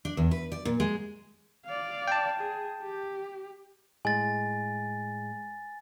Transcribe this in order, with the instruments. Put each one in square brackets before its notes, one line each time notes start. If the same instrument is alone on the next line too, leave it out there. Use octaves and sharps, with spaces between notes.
[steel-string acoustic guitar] D4
E2
B4
D5
A#2
G#3
[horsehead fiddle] D5 F5
[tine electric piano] G5 A5
[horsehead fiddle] G#4
G4
[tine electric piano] A2 G#3 [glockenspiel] G#5 A6